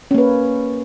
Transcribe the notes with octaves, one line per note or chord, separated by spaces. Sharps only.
A#3 C#4 B4